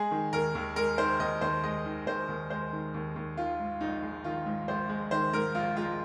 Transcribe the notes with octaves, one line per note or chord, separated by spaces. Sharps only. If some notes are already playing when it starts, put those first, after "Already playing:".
Already playing: G#3 G#4
D#3
D#2 A#4
D#2
G#3 A#4
D#3 C5
D#2 D#5
D#2 C5
G#3 D#5
D#3
D#2 C5
D#2
G#3 C5
D#3
D#2
D#2
D#3 F4
G#2
A#1 D#4
G#3
D#3 F4
G#2
A#1 C5
G#3
D#3 C5
G#2 A#4
A#1 F4
G#3 F4